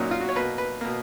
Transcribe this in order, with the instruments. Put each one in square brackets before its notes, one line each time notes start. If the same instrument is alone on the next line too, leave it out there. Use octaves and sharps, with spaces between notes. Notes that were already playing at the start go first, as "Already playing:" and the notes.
Already playing: [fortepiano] A#2 F#3 A#3 C#4 D#4
F4
F#4
C#5
B2 A#3 B4
B4
B2 A#3